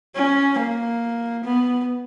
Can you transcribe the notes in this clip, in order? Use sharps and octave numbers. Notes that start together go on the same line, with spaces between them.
C#4
A#3
B3